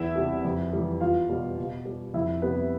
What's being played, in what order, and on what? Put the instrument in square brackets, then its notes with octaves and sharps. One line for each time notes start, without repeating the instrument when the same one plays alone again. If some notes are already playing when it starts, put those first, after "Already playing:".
Already playing: [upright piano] E2 E4 E5
C3 G3
F2
E3 G3
E2 F4 F5
B2 G3
B2
G3
F2 E4 E5
C3 G3 B3 B4